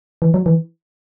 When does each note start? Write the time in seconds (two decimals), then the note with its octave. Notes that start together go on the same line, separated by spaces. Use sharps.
0.22 E3
0.34 F#3
0.46 E3